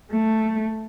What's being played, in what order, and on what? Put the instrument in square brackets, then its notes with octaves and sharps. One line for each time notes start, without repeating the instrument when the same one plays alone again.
[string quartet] A3